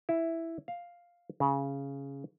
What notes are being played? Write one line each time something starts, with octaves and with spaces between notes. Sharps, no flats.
E4
F5
C#3